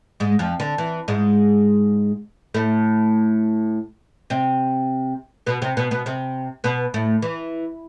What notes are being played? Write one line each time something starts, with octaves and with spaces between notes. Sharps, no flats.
G#2 G#3
F2 F3
D3
E3
G#2 G#3
A2 A3
C3 C4
B2 B3
C3 C4
B2 B3
B2 B3
C3 C4
B2 B3
A2 A3
E3